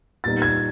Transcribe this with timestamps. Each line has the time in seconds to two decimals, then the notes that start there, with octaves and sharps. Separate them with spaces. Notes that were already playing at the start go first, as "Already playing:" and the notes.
0.24 A#2 G3 B3 D#4 A6
0.42 G#6